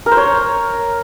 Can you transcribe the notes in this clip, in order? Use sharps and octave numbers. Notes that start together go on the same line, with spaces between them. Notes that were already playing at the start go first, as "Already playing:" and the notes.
A#4
C5
C#5